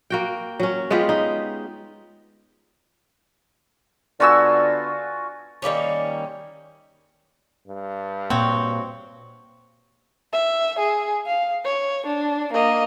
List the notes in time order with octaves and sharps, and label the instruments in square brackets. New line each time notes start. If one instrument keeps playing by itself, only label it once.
[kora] A#3 F#4 G5
F#3 C#4
G#3 B3 F4 G4
D#4
[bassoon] D3 [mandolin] B3 A5 E6 [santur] F4 F#4 G#5
[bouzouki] D#3 G3 A#3 C#4
[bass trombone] G2
[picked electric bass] A#2 A#3 [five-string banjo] C4 [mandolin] F#4 C#5
[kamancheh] E5
G#4
F5
C#5
D4
A#3 D#5